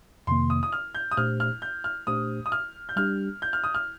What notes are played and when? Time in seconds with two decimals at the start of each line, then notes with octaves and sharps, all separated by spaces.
0.27 F2 C3 D#3 A#3 C6
0.50 D#6
0.63 D#6
0.72 F6
0.95 G6
1.11 D#6
1.17 A#2 A3 D4 G4 C5 F6
1.40 F6
1.62 G6
1.84 F6
2.07 A#2 A3 D4 G4 C5 D#6
2.46 D#6
2.52 F6
2.89 G6
2.96 G3 D4 G4 F6
3.42 G6
3.53 F6
3.64 D#6
3.75 F6